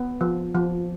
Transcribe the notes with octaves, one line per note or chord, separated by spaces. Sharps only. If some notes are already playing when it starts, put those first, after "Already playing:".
Already playing: B3
F3
F3